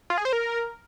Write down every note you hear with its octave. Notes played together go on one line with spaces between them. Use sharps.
F4
G#4
C5
A#4